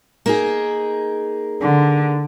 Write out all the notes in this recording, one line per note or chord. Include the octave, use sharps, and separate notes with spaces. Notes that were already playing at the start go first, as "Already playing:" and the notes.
A#3 D#4 G#4
D3